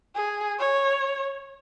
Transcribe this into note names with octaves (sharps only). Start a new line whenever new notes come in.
G#4
C#5